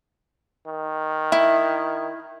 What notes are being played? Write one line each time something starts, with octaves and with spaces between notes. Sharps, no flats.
D#3
E4 E5